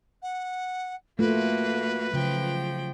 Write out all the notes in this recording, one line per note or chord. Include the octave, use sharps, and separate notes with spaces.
F#5
A3 A#3 F4 F#4 B4
C#3 F3 F#3 G5